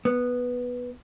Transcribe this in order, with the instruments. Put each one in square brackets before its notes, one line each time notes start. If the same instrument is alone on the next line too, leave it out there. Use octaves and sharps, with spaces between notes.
[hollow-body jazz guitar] B3